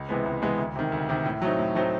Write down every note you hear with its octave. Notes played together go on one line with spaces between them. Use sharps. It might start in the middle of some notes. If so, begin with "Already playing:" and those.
Already playing: C#2
C3 E3 G#3 B3
C#2
C3 E3 G#3 B3
D2
C3 D#3
D2
C3 D#3
A2
F#3 A3 C4 D#4
A2
F#3 A3 C4 D#4